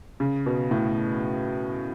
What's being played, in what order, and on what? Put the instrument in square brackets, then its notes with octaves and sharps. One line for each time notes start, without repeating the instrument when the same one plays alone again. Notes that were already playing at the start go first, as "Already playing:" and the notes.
[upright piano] C#3
B2
A2